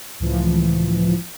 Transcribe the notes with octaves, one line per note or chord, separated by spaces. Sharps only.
C#2 A2 E3 F3